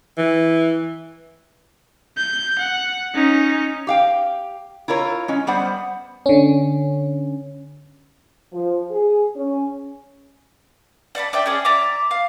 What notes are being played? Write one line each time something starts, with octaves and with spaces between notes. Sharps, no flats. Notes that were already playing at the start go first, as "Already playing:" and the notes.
E3
G6
F#5
C#4 D#4
G4 F5 G5
E4 F4 A#4 C#5
G#3 C#4
G3 B3 C5 F#5
D3 C#4
F3
G#4
C#4
D5 F#5 A5 B5
D4 D5 E5 G5
C#4 G#4 D5
D5 E5 A#5 D6
F5